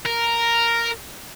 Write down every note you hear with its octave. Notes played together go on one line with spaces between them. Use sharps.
A#4